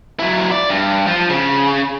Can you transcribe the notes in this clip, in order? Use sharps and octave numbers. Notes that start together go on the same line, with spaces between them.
F#3 E4
D5
G2
F3
C#3